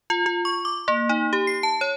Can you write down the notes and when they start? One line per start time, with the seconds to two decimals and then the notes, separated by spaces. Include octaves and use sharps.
0.10 F4
0.26 F4
0.45 C#6
0.65 D6
0.88 A#3
1.09 D#4
1.33 G4
1.47 C7
1.63 A5
1.81 C#5